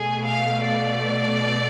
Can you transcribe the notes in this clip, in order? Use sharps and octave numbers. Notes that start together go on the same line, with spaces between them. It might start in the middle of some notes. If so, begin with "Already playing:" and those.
Already playing: B2 A3 G#4
F5
D5